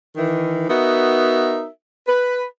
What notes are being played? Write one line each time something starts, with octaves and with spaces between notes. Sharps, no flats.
D#3 E3
B3 D#4 F#4 A#4 E5
B4